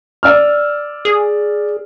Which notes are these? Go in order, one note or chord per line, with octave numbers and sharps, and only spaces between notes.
D5 E6 F6
G#4